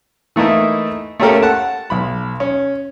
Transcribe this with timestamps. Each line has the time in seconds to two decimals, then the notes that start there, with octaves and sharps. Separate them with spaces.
0.36 E3 A3 A#3 D#4 E4
1.20 A3 A#3 C#4 G4 A4 A#4
1.42 F#5 A5
1.90 B1 B5
2.40 C#4